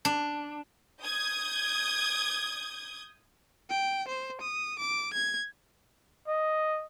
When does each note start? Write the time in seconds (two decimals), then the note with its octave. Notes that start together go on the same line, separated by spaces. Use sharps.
0.05 D4
1.01 D#6 G6 G#6
3.70 G5
4.08 C5
4.41 D#6
4.79 D6
5.14 G#6
6.28 D#5